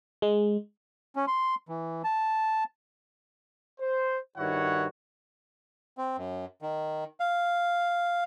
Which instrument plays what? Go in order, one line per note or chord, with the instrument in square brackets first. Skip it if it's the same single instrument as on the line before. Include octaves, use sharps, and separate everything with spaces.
[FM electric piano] G#3
[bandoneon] C#4
C6
E3
A5
[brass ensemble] C5
G2 D#3 E4 F#4 C#5 F#5
[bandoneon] C4
F#2
D#3
F5